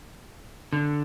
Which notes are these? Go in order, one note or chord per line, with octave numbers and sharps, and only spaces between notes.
D3